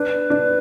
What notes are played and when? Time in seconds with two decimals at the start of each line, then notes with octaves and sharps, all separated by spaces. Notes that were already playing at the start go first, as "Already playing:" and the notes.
Already playing: D4 B4
0.30 D4